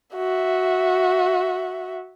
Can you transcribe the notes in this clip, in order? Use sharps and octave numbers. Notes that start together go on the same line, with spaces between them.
F#4 E5